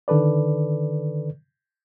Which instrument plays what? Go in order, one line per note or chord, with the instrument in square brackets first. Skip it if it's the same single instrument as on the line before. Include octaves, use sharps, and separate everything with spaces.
[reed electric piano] D3 D#3 A4 B4 D5